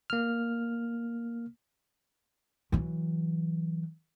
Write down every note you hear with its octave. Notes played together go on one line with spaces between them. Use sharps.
A#3 F6
E3 F#3